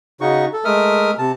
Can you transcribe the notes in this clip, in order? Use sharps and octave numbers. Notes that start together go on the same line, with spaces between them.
C#3 D#4 F#4 C#6
A4
G#3 A3 A#4 E5 D#6 F6
C3 A5